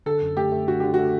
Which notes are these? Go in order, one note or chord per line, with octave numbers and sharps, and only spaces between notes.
D3 A4
F#2
A3 G4
A3
D3 F#4
D3 G4
A3 F#4